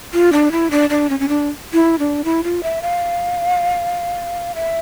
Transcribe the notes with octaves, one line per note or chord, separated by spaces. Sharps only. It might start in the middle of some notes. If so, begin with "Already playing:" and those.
F4
D4
E4
D4
D4
C#4
C#4
D4
E4
D4
E4
F4
E5
F5
E5